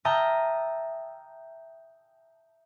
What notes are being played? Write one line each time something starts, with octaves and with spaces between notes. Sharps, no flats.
E5 G5 A5 A#5 D#6 F6